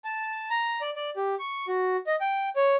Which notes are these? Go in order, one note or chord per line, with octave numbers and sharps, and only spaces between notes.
A5
A#5
D5
D5
G4
C#6
F#4
D#5
G5
C#5